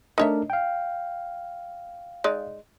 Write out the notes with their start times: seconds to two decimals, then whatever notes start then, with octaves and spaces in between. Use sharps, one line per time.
0.18 A3 D4 D#4 A#4 C#5 E5
0.50 F5 G5
2.24 G#3 D#4 D5